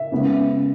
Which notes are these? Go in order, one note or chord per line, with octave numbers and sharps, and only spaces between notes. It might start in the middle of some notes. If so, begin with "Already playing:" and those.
Already playing: E5
C#3 G#3 B3